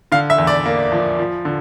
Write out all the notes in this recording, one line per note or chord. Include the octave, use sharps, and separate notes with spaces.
D3 F5
E5
E2
D5
A#3
F3
F3
D3